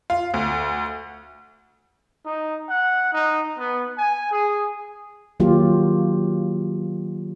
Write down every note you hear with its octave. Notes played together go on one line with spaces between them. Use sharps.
F4
D2
D#4
F#5
D#4
B3
G#5
G#4
D#3 F#3 A#3 F4 G4